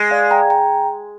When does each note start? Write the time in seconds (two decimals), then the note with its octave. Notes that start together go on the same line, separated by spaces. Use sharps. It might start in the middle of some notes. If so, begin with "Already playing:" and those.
Already playing: G#3
0.11 D5 F5
0.31 G5 A#5
0.50 G5 A#5